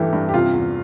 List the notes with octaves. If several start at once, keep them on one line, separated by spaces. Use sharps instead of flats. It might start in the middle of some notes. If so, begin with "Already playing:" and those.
Already playing: G2 E3 A3 G4
G2
G4
C3 F4
E2